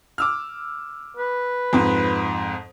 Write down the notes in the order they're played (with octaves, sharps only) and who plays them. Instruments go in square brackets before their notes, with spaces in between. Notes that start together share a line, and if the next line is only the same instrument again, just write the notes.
[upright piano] D6 E6 F6
[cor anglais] B4
[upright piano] F2 G#2